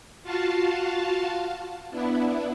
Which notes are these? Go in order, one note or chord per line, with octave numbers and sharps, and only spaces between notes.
F4 F#4 F5 A5
B3 D4 E4